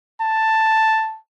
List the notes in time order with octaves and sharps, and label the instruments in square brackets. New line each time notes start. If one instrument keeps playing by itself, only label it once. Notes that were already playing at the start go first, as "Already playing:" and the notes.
[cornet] A5